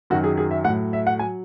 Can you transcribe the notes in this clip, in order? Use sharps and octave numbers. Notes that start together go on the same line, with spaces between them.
F#2 D#3 F#3 F#4
G#4
G#4
E5
A2 F#3 F#5
E5
F#5
F#3 G#5